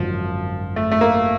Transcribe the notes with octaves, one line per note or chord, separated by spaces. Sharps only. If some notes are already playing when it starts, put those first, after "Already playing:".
Already playing: G#1 F#2 D3 F3
A3
A3
A#3